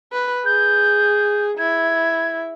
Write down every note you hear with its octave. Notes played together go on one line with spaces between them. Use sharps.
B4
G#4 G6
E4 G#6